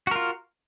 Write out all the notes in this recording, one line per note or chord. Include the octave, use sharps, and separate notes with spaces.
F4 F#4 A#4